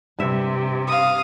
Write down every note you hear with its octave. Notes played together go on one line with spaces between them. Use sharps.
G2 C3 E5
F5 D#6